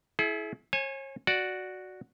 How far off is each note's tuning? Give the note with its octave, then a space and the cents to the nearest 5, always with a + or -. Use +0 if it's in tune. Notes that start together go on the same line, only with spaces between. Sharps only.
E4 +0 G#4 +40
C#5 -40 G#5 +0
F#4 +0 D5 +0